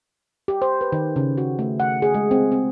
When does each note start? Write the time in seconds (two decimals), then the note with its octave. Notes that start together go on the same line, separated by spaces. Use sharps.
0.48 G4
0.62 C5
0.81 B4
0.92 D#3
1.16 C#3
1.38 F#4
1.59 A3
1.80 F#5
2.02 G#4
2.14 G#3
2.31 C4
2.52 C4